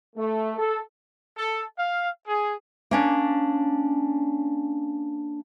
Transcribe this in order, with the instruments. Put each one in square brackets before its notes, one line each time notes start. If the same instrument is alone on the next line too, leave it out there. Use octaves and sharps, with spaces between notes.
[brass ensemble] A3
A4
[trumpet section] A4
F5
G#4
[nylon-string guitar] A#3 C#4 D4